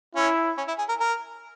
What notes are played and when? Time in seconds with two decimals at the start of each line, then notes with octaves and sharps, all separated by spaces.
0.15 C#4 E4
0.58 C#4
0.68 E4
0.78 G#4
0.89 A#4
1.00 A#4